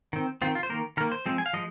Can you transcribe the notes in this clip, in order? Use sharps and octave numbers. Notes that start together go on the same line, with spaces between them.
D#3 C4
D#3 C4 F4
F4
C5
D#3 A#3 A#4
D#3 A#3 A#4
C5
F3 G#3 C4
G#5
F5
F3 G#3 D#5